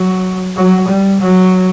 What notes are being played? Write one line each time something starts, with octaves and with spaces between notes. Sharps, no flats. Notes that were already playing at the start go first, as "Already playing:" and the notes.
Already playing: F#3
F#3
G3
F#3